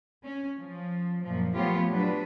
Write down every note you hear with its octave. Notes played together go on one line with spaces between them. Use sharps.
C#4
F3
F#2 A#2 F3
F3 A3 B3 F4 G4 C#5
F#3 D4 B4